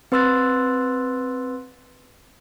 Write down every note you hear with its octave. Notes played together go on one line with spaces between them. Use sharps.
C4 B4 C6 E6 F#6 A6